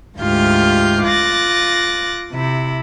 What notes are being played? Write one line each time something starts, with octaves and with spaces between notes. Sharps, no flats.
D2 G#2 F4 G4 F6 G6
F4 D6 F#6 A6 A#6
C3 E4